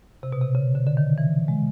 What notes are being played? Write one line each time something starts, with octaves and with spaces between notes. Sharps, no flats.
C3
B2
C3
C#3
D3
D3
D#3
E3
G#3